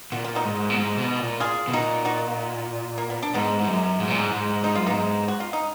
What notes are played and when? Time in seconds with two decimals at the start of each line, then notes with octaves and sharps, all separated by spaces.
0.12 A#2 F#4
0.24 F4
0.35 D#4 F#4
0.44 G#2
0.70 A#2
0.76 G#2
0.98 B2
1.19 A#2
1.40 F4 G#4
1.68 B2
1.73 A#2 D#4 F#4
2.05 D#4 F#4
2.98 A#3
3.10 B3
3.23 D4
3.34 G#2 B3 D#4
3.59 G#2
3.67 F#2
4.00 G#2
4.08 A#2
4.18 G#2
4.31 G#2
4.63 G#2 D#4
4.75 F#2 F4
4.87 G#2 B3 D#4
5.28 F#4
5.40 F4
5.53 D#4